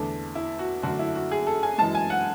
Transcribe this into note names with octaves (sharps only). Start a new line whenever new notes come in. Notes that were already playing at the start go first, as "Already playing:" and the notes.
Already playing: E2 D3 A3 D4
E4
F#4
F#2 D3 A3 D4 F#4
E4
F#4
G#4
A4
G#5
F#2 E3 G#3 A5
G#5
F#5